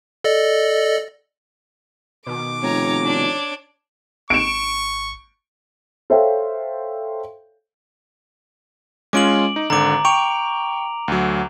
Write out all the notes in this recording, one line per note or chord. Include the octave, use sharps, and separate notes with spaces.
A4 D5 D#5
B2 D#3 D6
F1 C#5 A#5
D4 C#5
G#1 C#6 D7 E7
A4 C5 C#5 E5 F5 G5
G#3 C#4 F4 D6 D7 F#7
D#4
G#1 D3 A#5 D6
G5 C#6 D7 F7
D2 F#3